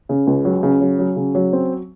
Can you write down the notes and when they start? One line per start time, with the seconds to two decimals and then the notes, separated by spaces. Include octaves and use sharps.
0.09 C#3
0.27 C#2
0.45 F#3
0.63 C#3
0.81 F#3
0.99 F#3
1.16 C#3
1.35 F#3
1.53 C4